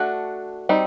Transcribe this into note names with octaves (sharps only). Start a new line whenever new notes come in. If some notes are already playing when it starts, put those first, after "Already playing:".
Already playing: A3 D4 F#4
G3 C4 D#4